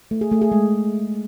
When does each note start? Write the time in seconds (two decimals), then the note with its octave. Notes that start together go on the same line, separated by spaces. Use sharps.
0.11 A3
0.21 G#4
0.31 A3
0.42 G#4
0.52 G#3